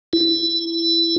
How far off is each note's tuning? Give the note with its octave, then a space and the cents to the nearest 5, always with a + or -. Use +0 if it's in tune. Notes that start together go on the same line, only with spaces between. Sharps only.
E4 +15